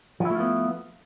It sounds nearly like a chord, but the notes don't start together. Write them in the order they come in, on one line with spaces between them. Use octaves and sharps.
F3 E4 A3 F4 B3